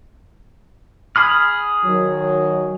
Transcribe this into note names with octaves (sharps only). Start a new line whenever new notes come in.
G#4 B5 F6
D#3 F#3